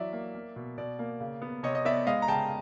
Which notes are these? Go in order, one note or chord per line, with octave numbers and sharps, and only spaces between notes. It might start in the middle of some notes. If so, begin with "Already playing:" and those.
Already playing: E3 F#3 D5 E5
A#3
A#3
B2
B2 D5
A#3
C#3
B3
C3 C#5 D#5
D#5
B3 D5 E5
G#3 D#5 F5
A#5
C#3 G5 A5